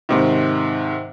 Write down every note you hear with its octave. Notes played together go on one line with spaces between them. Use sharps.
G#2 C3 D#3